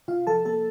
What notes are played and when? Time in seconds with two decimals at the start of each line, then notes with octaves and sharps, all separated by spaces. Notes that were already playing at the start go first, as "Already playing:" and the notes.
0.08 C3 F4 F5
0.27 F3 A4 A5
0.45 A#3 A4 A5